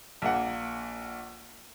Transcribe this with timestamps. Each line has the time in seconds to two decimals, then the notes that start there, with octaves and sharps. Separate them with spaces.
0.22 A#1 A#3 F#5